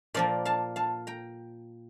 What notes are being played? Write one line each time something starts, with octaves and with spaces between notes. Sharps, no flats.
A#2 F3 A#3 D5 F5
F5 A5
F5 A5
G5 A#5